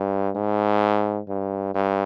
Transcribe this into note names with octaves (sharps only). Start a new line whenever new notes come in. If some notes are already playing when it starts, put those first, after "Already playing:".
Already playing: G2
G#2
G2
G2